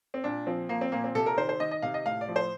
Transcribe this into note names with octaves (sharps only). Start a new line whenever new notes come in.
C4
A#2 D4
F3 C4
F3 A#3
C4
A#2 A#3
C4
C3 A4
A#4
D#3 C5
C5
D#3 D#5
D#5
C3 F5
D#5
A2 F5
D5
F3
C5